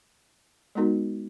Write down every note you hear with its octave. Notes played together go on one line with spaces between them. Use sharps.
G#3 B3 D#4 F#4 A#4